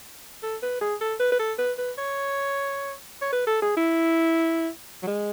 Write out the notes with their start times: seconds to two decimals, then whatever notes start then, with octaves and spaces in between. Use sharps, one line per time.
0.43 A4
0.63 B4
0.81 G#4
1.01 A4
1.20 B4
1.32 B4
1.40 A4
1.59 B4
1.78 B4
1.98 C#5
3.22 C#5
3.33 B4
3.47 A4
3.62 G#4
3.77 E4
5.03 F#3
5.07 G#3